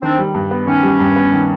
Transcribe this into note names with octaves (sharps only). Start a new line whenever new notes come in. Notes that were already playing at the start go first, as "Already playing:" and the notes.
D#3 C4 D4
G3
G2
B3
D#3 C#4
G3
G2
B3
D#3